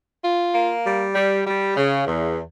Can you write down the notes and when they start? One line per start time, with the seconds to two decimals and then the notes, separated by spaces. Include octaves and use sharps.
0.23 F4
0.54 A#3
0.85 G3
1.15 G3
1.46 G3
1.76 C#3
2.07 E2